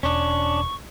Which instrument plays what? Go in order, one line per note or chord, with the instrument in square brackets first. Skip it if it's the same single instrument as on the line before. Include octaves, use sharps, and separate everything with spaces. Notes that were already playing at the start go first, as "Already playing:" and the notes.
[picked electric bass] E1 [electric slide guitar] C#4 D4 [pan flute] C#6